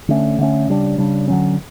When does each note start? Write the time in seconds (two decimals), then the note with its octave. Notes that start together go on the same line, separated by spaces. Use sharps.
0.08 D3 A3 C#4
0.39 D3 A3 C#4
0.69 C#3 G3 D4
0.98 C#3 G3 D4
1.28 D3 F#3 C#4